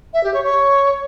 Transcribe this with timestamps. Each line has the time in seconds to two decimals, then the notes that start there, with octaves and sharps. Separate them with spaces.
0.14 E5
0.24 G4
0.34 C#5
0.44 C#5